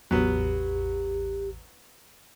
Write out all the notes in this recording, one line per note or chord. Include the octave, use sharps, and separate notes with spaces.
A1 E2 F#3 B3 G4